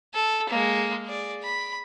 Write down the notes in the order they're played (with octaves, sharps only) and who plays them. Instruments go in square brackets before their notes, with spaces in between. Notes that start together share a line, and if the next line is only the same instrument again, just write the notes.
[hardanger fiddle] A4
G#3 A#3
G#4 D5
B5